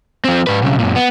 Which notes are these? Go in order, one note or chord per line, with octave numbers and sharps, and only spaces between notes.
F3 C4
G#2 B4
B1 C#3
F#2 A#2
B3